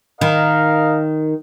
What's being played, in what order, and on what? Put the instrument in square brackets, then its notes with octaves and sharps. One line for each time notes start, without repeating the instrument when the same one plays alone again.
[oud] D#3 [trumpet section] A#4 D#5 F5